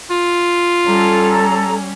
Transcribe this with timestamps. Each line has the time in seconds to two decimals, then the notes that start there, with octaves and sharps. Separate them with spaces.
0.10 F4
0.86 G3 C#4 A4 A#5